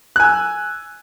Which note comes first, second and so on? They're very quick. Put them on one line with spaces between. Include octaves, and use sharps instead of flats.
F#6 G#5 E6